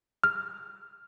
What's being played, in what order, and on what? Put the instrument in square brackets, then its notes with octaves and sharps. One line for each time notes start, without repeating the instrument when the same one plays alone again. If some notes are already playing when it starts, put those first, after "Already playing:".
[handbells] F6